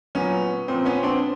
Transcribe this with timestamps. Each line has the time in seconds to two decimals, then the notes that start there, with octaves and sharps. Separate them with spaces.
0.15 A#2 F#3 B3 C#4
0.68 A#2 F3 C4
0.85 B3 C#4
1.03 C4 D4